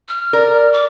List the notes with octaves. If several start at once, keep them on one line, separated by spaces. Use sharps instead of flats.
F6
A#4 D5
D6